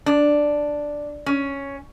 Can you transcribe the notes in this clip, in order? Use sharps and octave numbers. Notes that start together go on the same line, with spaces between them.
D4
C#4